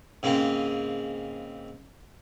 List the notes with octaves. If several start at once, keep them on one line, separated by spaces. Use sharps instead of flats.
G#2 C#3 A#3 C4